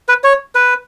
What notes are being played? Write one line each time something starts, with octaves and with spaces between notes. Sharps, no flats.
B4
C#5
B4